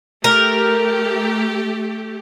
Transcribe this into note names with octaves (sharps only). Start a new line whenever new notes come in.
A3 G4 A#4